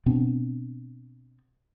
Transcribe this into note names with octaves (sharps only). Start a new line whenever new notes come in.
B2 B3 C4 D4